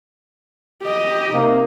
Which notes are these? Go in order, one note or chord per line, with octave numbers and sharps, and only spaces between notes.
G4 D#5
C3 A#3 D#4